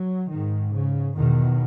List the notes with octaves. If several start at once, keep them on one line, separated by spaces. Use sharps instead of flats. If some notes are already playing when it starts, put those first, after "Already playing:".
Already playing: F#3
G#2 D#3
C#3
E2 B2 D#3